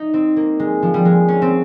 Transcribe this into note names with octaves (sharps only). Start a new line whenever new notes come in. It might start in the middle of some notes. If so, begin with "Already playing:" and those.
Already playing: D#4
C4
A#3
G#3
F3
G3
G#3
C#4
C4